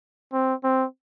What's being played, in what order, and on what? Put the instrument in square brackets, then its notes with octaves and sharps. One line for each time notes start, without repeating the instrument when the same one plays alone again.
[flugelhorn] C4
C4